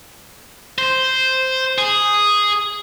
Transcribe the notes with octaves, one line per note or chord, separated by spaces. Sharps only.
C5
G#4